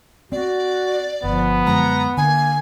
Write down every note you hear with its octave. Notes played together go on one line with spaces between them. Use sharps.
C4 F#4 D5
G1 F3 B3
F#2 D3 G#3 A#5
D3 A#3 G#5